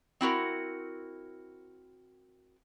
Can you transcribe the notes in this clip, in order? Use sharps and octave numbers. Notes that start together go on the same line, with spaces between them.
C4 E4 F#4 A#4